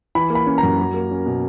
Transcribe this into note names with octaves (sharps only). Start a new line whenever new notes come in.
E3 B5
A#3
B5
C#4
A#5
F#2
F#3
A#3
C#4
B2